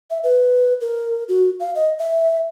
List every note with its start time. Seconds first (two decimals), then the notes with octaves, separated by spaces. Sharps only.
0.11 E5
0.24 B4
0.81 A#4
1.29 F#4
1.60 F5
1.75 D#5
1.99 E5